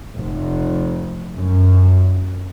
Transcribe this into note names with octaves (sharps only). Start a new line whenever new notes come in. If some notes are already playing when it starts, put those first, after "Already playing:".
F1
F#2